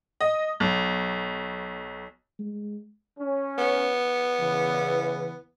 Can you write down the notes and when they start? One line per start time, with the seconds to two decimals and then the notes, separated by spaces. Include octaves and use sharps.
0.21 D#5
0.60 B1
2.39 G#3
3.19 C#4
3.58 B3
4.41 E2 C#3 E3